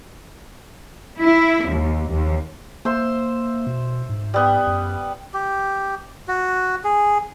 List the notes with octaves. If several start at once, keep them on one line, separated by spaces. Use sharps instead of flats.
E4
D#2
D#2
A#3 C5 E5 C6
B2
G#2
G3 B3
F#2
G4
F#4
G#4